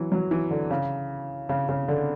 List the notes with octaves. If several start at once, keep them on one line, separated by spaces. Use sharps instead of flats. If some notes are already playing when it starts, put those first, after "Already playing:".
Already playing: E3 F#3
F#3
E3
D3
C#3
C#3
C#3
D3